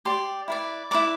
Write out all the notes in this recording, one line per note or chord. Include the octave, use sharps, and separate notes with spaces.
G4 D5 C6
E4 B4 D5
E4 B4 D5 D6